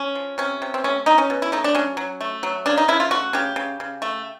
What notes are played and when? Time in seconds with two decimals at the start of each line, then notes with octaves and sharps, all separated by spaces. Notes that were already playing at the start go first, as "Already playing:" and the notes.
Already playing: C#4
0.15 F3
0.38 C3 C#4
0.62 C3
0.74 C4
0.84 A3 C#4
1.06 F#3 D#4
1.18 C#4
1.30 B2
1.42 E4
1.52 A3 D#4
1.64 D4
1.75 F#3 C#4
1.97 F#3
2.21 A3
2.43 F#3
2.66 C#3 D4
2.77 D#4
2.88 C#3 E4
3.00 F4
3.11 A3 F#4
3.33 C#3 G4
3.56 C#3
3.80 C#3
4.02 A3